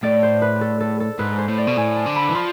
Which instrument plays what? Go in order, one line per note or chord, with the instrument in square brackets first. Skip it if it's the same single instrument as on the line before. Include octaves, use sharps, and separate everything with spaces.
[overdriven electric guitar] A2 [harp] D5
[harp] C5
B4
A4
A4
A4
[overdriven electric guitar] G#2 [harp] B4
[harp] C5
[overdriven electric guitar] A2
[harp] D5
[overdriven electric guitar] B2
[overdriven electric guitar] A2 [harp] G#5
[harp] A5
[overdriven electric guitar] D3
[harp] B5
[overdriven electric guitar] E3
[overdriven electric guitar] F3 [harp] C6